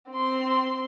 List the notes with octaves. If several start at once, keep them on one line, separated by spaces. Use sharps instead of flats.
C4 C6